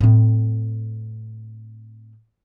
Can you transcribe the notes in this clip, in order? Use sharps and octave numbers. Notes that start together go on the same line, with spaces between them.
A2 C4